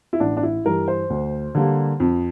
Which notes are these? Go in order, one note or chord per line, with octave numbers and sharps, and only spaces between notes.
E4
A1 D4
D4
E4
G2 E3 G3 A#4
C5
D2
D3 G3 A#3
F2